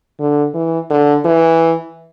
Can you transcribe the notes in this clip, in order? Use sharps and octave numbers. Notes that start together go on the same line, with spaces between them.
D3
E3
D3
E3